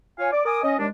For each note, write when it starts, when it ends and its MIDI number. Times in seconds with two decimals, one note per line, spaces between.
0.18 0.30 65
0.18 0.30 73
0.18 0.30 77
0.18 0.30 80
0.32 0.40 74
0.32 0.40 86
0.44 0.62 70
0.44 0.62 80
0.44 0.62 86
0.44 0.62 87
0.63 0.74 61
0.63 0.74 75
0.78 0.87 39
0.78 0.87 56
0.78 0.87 62